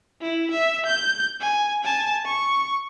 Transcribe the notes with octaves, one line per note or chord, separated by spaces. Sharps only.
E4
E5
G6
G#5
G#5 A5
C#6